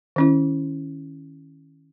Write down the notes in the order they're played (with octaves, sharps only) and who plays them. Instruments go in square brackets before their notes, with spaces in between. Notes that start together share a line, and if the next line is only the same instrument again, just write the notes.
[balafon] D#3 C#4 E4